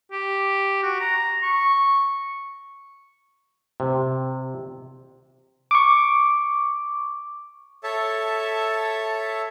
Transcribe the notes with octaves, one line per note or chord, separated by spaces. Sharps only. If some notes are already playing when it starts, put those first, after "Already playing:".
G4
F#4
A#5
C#6
C3
C#6 D6
A4 C#5 E5 A5